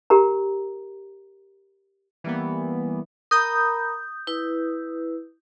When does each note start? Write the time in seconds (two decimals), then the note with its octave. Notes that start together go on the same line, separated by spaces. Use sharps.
0.10 G4 A#4 A#5
2.24 E3 G3 A#3 B3
3.31 A#4 A#5 B5 D#6 G6
4.27 E4 B4